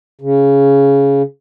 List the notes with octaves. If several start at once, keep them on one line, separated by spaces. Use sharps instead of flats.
C#3